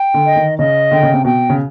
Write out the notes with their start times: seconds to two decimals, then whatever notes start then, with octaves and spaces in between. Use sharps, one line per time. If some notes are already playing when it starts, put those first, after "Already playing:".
Already playing: G5
0.14 D3
0.25 D#5
0.36 D#3
0.58 C#3 D#5
0.91 D3 G5
1.03 C#3
1.13 C3
1.25 B2 G5
1.50 C#3